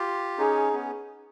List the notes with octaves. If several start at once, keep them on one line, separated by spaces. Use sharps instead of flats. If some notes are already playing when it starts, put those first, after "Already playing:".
Already playing: F4 G4
C#4 D#4 G#4
B3 C#4